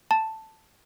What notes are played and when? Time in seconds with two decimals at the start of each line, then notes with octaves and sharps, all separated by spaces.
0.11 A5